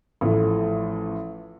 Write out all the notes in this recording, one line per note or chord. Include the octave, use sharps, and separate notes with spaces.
A1 A2 F3 A3